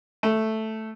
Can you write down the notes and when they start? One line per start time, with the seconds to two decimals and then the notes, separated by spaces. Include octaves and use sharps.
0.23 A3